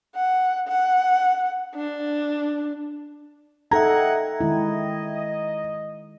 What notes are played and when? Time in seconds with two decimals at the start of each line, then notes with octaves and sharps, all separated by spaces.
0.15 F#5
0.68 F#5
1.75 D4
3.71 D#4 A4 D#5 E5 F#5 G5 A#5 G#6
4.41 D#3 G#3 E4 D#5